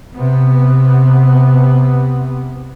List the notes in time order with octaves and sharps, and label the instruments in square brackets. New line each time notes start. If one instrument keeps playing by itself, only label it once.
[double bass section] C3 B3